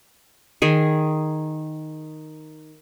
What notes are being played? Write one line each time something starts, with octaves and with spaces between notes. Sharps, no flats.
D#3 G#4